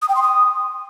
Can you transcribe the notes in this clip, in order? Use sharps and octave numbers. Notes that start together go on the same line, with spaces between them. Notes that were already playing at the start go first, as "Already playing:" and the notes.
D#6
G5
C6
D#6